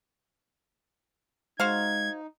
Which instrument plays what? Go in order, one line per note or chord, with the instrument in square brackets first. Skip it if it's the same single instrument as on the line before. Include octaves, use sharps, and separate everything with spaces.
[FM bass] G#3 [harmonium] D#4 [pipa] F#4 C5 F5 [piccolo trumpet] G#6